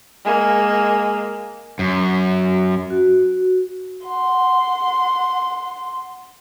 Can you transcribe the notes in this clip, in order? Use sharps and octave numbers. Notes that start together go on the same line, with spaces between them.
G#3 A#3
F#2
F#4
F#5 C6